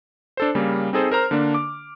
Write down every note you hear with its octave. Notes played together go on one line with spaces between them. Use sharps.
D4 A4 C5
C#3 G3 A#3
C4 D#4 G#4 A4 C5
A#4 C5 A#5 F6
D3 A#3 D4
D6